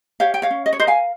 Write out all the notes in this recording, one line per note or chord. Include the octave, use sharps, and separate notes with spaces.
G4 C#5 F5
G5
C#5 F5
C#4
D#5
C#5
A#4 C5 D#5
F5 G#5